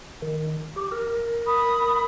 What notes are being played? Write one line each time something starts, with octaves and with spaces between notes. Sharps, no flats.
D#3
G4
A#4
B5 D#6